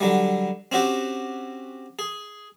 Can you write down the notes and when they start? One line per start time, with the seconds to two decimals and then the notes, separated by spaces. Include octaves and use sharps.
0.01 D3 F#3 G3
0.72 C4 C#4 F#4 G4
1.99 G#4